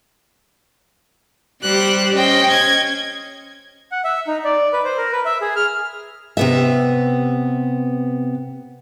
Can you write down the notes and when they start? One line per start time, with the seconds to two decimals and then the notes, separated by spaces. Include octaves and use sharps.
1.62 G3 G4 C5 F#6
2.16 C#4 C5 D#5 G5
2.51 G#6
3.92 F#5
4.04 E5
4.27 D#4
4.44 D5
4.73 B4
4.84 C5
4.97 A#4
5.12 B4
5.25 E5
5.41 G#4
5.56 F6
6.37 C3 B3 E5